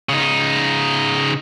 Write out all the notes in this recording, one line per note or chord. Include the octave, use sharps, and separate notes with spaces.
C#3 D#4